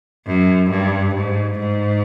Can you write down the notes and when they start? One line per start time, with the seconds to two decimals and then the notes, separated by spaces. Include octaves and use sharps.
0.27 F#2
0.70 G2
1.15 G#2
1.58 G#2